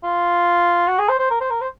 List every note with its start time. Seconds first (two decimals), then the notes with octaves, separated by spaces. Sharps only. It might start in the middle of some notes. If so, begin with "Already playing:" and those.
0.04 F4
0.88 F#4
0.99 G#4
1.09 C5
1.19 C5
1.30 A#4
1.41 C5
1.50 A#4
1.61 C5